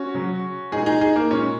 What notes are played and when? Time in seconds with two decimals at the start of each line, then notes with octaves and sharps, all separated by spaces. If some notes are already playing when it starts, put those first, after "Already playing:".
Already playing: C#4 F#4
0.14 C#3 F#3
0.72 A#2 G#3 D#4 G#4
0.86 D#4 G#4
1.01 D#4 G#4
1.16 A#3 D#4
1.31 A#2 G#3 C#4